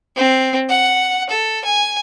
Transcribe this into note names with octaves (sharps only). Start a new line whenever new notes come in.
C4
F#5
A4
G#5